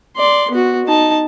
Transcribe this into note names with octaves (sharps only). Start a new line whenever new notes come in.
D5 C6
B3 F#4
D#4 A5